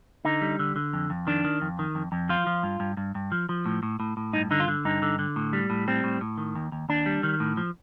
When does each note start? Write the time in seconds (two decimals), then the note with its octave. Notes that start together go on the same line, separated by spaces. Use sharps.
0.25 D3 D#4
0.42 G3
0.59 D3
0.76 D3
0.93 F2
1.10 F2
1.27 D#3 D4
1.44 D#3
1.62 F2
1.79 D#3
1.95 F2
2.12 F2
2.29 F3 F4
2.47 F3
2.63 G2
2.80 G2
2.97 G2
3.15 G2
3.32 F3
3.49 F3
3.66 A2
3.83 A2
4.00 A2
4.17 A2
4.33 G2 D#4
4.51 D3 D#4
4.60 F4
4.68 D3
4.85 G2 D#4
5.02 D3
5.19 D3
5.36 A2
5.53 G3
5.70 A2
5.88 G3 C4
6.04 A2
6.21 A2
6.38 D#3
6.55 D#2
6.72 D#2
6.89 D#2 D4
7.06 G3
7.23 D#3
7.40 A2
7.57 F3